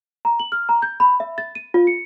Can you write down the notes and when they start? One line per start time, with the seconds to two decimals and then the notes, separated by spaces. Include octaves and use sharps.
0.25 A#5
0.40 F#7
0.52 F6
0.69 A#5
0.82 G6
1.00 B5
1.20 E5
1.38 A6
1.55 D#7
1.74 F4
1.87 C#7